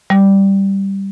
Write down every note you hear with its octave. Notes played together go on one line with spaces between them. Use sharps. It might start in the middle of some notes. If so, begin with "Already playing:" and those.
G3